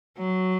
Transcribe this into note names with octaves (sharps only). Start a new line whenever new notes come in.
F#3